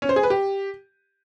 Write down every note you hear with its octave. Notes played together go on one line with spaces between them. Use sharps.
C#4
C5
G#4
B4
G4